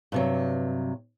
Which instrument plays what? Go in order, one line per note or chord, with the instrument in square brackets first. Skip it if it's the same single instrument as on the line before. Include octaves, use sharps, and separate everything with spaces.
[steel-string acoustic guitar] G2 C3 F#3